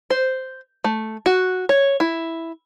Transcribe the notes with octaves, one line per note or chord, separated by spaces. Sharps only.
C5
A3
F#4
C#5
E4